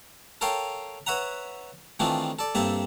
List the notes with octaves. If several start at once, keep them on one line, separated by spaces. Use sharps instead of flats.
A4 A#4 C#5 F5 G5
B4 C#5 E5 F#5 A#5
D#3 E3 A3 C4 D4 F4
A4 D5
G2 A#3 C4 A4 E5